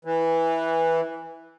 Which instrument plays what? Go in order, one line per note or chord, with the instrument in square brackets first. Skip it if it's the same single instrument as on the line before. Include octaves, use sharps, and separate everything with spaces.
[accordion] E3